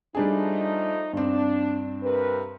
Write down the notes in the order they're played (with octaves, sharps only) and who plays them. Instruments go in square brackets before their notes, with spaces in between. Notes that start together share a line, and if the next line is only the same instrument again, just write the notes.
[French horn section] F3 A3 D#4 [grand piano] G3 D4 G#4
[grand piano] G2 C4 [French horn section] D4
[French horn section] C3 A#4 B4